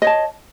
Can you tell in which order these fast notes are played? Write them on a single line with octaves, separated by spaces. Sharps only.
D#5 C#5 A5